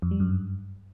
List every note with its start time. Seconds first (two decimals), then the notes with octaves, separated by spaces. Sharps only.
0.02 F2
0.11 G3
0.20 F#2
0.29 G2